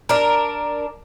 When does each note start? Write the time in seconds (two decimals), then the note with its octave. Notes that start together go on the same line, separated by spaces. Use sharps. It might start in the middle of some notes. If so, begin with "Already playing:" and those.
0.09 D4 A#4